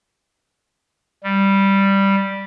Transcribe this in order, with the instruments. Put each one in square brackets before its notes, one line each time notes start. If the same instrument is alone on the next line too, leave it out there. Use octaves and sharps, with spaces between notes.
[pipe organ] G3